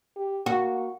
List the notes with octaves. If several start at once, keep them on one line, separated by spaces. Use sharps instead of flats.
G4
A#3 F#4